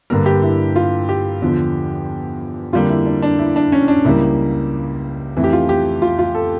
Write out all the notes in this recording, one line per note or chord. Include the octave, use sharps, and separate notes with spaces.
G2 D3 G3 A#3 A#4
G4
E4
F4
G4
E2 D3 F3
F2 D3 G3 A#3 F4
E4
D4
D4
E4
D4
C#4
D4
C#2 C#3 G3 A#3 E4
F2 E3 A3
G4
F4
G4
F4
F4
A4